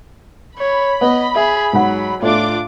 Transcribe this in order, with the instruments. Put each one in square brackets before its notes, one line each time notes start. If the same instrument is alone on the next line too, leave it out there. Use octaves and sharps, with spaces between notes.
[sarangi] C#5 [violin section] B5
[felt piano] B3 [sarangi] D#5
[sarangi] G#4 [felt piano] E5
[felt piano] G#2 F#5 [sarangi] F#3
[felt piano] A2 [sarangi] D4 [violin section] F4 D6